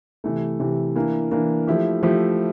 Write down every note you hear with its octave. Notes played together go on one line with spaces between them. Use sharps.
C3 E3 A3
C3 E3 A3
E3 A#3 D4
E3 A#3 D4
F3 A3 E4 G4
F3 A3 E4 G4